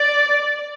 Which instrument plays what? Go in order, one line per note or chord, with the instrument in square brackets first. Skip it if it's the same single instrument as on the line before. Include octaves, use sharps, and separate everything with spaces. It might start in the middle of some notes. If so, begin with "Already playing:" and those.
Already playing: [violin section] D5